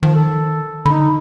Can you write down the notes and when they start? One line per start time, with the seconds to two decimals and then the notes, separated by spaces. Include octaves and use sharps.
0.03 D#3 F3
0.14 A4
0.86 D3 D#4 B5